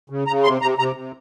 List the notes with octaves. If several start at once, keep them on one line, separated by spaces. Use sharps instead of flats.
C#3
C#3 A#5
C3 C6
C3 A#5
C3 A#5
C3